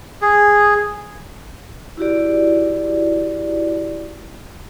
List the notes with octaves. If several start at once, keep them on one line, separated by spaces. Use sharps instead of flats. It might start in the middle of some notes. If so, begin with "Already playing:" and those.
G#4
E4 F#4 G4 D5